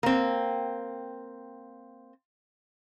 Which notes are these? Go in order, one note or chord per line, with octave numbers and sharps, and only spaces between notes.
A#3 C4